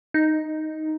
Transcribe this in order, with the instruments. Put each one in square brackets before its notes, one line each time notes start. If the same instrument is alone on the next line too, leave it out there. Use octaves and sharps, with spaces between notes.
[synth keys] D#4